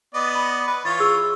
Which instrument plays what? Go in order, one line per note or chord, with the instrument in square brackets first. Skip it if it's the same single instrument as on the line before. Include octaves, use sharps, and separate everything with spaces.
[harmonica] B3 D5 D#5
[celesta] B5
[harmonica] B4
[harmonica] E3 F4 C#5 [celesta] A6
[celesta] G#4 E6